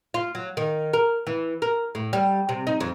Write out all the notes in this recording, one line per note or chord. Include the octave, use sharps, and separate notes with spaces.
F4
F#3
D#3
A#4
E3
A#4
A2
G3
C3
D#4
F2